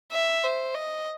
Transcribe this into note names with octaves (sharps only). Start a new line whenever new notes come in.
E5
C5
D#5